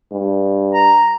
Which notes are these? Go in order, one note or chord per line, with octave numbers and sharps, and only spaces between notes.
G2
A#5